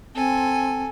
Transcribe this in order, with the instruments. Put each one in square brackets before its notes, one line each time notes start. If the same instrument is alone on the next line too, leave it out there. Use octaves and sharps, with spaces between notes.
[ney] C4 [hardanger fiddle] A4 G#5